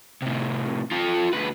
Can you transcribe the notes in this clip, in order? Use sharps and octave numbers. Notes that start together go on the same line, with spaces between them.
A2 C3
F4 A4
D2 B4